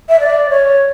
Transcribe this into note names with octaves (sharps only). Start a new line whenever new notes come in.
E5
D5
C#5